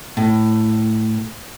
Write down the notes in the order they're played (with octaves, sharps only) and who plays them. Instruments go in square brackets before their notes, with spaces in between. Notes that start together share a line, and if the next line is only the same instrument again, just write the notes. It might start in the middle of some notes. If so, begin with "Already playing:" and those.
[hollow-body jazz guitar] A2